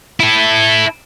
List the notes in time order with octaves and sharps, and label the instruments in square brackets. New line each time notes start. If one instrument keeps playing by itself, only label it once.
[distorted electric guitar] E4 A4